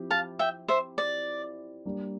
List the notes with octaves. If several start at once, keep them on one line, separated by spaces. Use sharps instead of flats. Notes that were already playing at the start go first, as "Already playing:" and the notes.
Already playing: F3 C4 E4 G4
F5 A5
E5 G5
C5 E5
D5
G3 A#3 D4